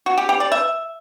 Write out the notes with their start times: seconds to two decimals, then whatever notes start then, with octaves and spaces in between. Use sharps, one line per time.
0.06 F#4
0.18 G4
0.29 G4
0.40 D5
0.52 E5